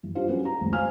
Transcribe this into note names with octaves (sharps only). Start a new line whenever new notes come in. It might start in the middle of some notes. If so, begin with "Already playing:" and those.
G2 E3
D4 F4 G4 C5 F5
F#3 B3 C#4 E4 F#4 G#4
A#5
G#1 C#2
C5 F5 G#5 F6